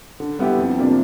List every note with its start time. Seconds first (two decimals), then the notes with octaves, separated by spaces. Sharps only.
0.20 D3
0.39 G3 B3 E4 G4
0.59 F2
0.78 C3 F3 A#3 D4